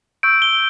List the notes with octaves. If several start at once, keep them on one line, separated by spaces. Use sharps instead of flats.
C#6 E6 G6 D7
G7